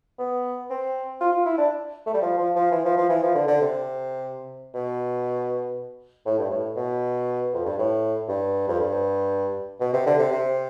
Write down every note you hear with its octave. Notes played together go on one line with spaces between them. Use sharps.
B3
C4
F4
F4
E4
D4
A3
G3
F3
F3
F3
E3
F3
F3
E3
F3
D3
D3
C3
B2
A2
G2
A2
B2
F2
G2
A2
G2
F2
G2
B2
C3
D3
C3
C3